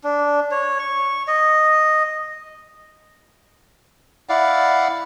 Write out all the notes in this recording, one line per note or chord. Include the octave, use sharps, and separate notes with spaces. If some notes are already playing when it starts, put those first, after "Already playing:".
D4
C#5
C#6
D#5
E4 D5 F5 F#5